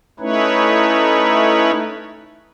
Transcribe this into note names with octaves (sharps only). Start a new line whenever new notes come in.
A3 C#4 D#4 E4 B4 C#5